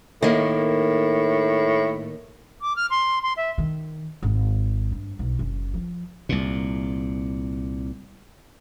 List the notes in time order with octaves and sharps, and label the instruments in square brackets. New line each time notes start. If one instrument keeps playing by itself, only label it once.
[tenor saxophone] A2 [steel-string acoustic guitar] D#3 A#3
[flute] D6
F6
C6
C6
E5
[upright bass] D#3
G#1
G2
B1
F#1
F3
[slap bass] C2 A#2